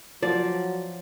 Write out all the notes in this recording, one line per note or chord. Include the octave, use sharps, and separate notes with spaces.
F3 F#3 D5